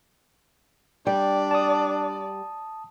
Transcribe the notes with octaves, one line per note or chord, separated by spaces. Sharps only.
G3 D4 D5 G5
A5 D#6